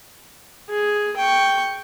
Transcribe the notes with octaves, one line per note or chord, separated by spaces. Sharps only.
G#4
G5 C#6